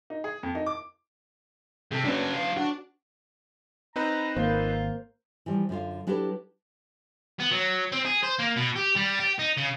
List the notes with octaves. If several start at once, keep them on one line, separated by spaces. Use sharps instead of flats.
D#4
G#4
F2
D#4
D6
C3 G#4 A4
C#3 F#3 B3 C#4 D4
F#3 F5
D4 F#4
C4 D#4 B4 A#5
G#1 A#3 F4 C5
E3 F3 G3
F#2 D3 F4 F5
F#3 D4 E4 G4 A4 B4
B3
F#3
C4
G#4
C5
A#3
B2
G4
G3
G4
D#4
C#3